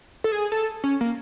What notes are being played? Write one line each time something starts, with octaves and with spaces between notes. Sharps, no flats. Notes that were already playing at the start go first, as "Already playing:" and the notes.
A4
G#4
A4
C#4
A#3